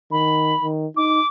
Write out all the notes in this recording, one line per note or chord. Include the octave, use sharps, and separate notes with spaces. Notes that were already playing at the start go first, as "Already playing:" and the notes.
D#3 B5
D#3
D#4 D6